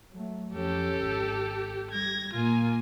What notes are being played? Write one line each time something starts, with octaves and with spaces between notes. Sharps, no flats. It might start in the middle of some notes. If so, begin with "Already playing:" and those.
F#3 A3
F2 C#4 G4 A4
G#1
G3 G#6 A#6
A#2 A#3 F4 G#5